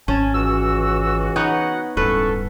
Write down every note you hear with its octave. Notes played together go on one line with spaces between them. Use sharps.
G#1 C#4 G#5 A5
C#2 E3 F#4 E6
B3 D#4 C#5 F#5
D1 G2 E3 C#4 A4 B4 C#6